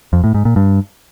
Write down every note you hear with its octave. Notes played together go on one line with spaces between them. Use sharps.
F2
A2
G#2
A#2
G2